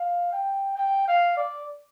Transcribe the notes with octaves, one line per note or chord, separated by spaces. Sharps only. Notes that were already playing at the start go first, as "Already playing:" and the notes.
Already playing: F5
G5
G5
F5
D5